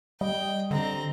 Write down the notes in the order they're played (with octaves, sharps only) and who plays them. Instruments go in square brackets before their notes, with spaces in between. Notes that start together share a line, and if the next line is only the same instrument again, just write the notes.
[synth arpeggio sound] G3 [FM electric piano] D#5 [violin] G5
[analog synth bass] D3 [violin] C4 A#5